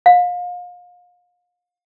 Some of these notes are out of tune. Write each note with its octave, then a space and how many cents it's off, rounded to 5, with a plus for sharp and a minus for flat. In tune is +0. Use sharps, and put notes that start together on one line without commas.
F5 +35